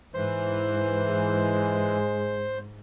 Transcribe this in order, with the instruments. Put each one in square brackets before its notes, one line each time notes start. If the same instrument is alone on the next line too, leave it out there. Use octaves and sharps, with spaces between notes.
[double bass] G#2 [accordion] E3 [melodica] C5
[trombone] G#3